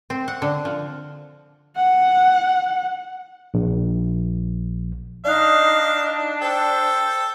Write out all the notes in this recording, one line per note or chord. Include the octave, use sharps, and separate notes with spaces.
C4
F#5
D3
F3
F#5
A#1
D4 D#4 D5 F5 F#6
A4 C5 G5